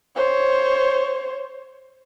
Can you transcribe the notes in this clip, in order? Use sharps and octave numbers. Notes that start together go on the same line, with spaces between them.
C5 C#5